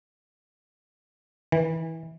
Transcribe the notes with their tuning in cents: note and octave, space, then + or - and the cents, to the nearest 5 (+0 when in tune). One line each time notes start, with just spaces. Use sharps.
E3 -25